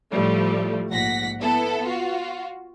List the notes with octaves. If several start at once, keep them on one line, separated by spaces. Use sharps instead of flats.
A2 F3 G3 A3
A#1 G#2 F#5 A#6 B6
B3 E4 A4
F4 F#4